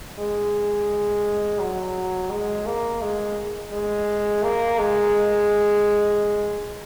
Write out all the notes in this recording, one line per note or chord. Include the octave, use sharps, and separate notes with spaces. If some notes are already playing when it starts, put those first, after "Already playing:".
G#3
F#3
G#3
A#3
G#3
G#3
A#3
G#3